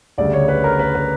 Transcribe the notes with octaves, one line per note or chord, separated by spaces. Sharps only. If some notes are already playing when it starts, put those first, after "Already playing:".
D2 C#3 G3 D5
C#5
B4
A#4
B4
B4